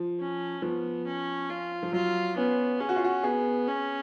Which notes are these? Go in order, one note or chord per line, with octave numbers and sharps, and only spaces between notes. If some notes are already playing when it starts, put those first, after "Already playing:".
Already playing: F3
C#4
F3 B3
C#4
F4
F3
F#3 F4
B3 C#4
C#4 G#4
F#4
F4
F#4
B3 G#4
C#4